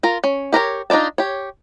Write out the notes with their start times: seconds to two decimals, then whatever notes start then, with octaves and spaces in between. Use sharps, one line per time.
0.03 F4 A#4
0.24 C#4
0.53 G4 A#4 B4 C#5
0.90 D4 D#4 F4 D5 A5
1.18 G4 C#5